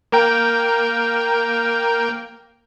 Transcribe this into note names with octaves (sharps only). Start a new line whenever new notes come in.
A#3 A#4 G5